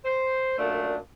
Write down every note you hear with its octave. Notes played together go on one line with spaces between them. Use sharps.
C5
F#2 A#2 A3 D4